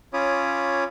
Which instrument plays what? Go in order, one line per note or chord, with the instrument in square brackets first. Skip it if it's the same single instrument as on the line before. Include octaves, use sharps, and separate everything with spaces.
[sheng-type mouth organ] C#4 F4 C#5 B5 D6 D#6